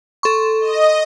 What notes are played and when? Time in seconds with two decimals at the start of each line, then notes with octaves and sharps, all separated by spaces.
0.23 A4 C6 C#6
0.61 D#5